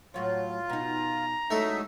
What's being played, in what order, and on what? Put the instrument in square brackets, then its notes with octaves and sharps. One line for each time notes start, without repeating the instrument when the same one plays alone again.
[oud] A2 F#3 C#5 [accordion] F4
[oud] B2 D#4 [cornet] A#5
[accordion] F#3 D#4 E5 [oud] G#3 C#4 E4 [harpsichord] A3 A4